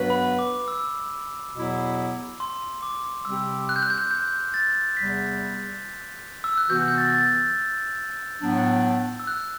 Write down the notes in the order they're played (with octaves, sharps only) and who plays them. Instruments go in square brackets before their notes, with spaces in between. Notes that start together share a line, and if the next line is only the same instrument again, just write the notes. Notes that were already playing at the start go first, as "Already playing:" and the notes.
Already playing: [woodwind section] G2 F#3 B3 F#4 B4
[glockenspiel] B5
D6
E6
[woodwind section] E2 B2 F#3 B3 E4
[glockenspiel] C6
D6
[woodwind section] C3 G3 C4 G4 [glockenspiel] E6
[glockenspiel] F#6
G6
F#6
G6
F#6
G6
A6
[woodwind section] E2 C3 G3 [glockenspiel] B6
[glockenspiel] E6
F#6
[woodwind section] C3 E3 B3 F#4 [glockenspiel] G6
[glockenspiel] F#6
G6
A6
A6
G6
[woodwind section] A2 F#3 B3 D4
[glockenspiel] E6
F#6